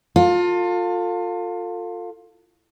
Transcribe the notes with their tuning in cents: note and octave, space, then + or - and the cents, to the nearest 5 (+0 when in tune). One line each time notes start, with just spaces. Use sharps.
F4 +20 A4 +30